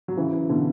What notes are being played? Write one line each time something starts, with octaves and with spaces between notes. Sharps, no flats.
F#3
C#3 E3
B2 D3